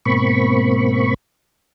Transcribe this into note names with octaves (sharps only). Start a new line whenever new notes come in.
G#2 B2 A#3 C4 B5 C#6